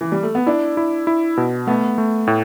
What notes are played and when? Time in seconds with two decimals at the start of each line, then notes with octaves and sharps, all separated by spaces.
0.01 E3
0.12 G3
0.23 A3
0.35 B3
0.46 D4 E4
0.77 E4
1.07 E4
1.37 B2
1.67 A3 B3
1.98 A3
2.27 A2